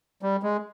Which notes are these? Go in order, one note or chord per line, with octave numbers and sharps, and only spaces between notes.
G3
G#3